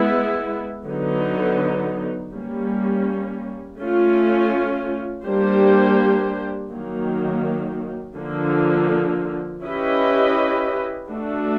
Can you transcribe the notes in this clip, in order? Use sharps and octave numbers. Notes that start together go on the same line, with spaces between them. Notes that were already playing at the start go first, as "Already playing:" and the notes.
Already playing: G#3 B3 E4
D3 F#3 B3 D#4
G3 A#3 C#4
A3 C#4 F4
G3 A#3 D4 G4 C5
D#3 F#3 A#3
D3 F3 A#3
C#4 E4 G4 B4 D#5
A3 D4 F#4 A4